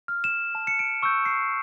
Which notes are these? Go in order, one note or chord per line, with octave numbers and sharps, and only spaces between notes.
F6
E7
A5
C#7
D7
C#6 E6 G6
C7